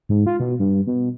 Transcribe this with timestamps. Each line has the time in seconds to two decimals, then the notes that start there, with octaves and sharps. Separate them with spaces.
0.09 G#2
0.27 F4
0.40 B2
0.59 G2
0.87 B2